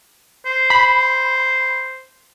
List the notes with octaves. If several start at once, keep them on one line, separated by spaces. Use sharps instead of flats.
C5
B5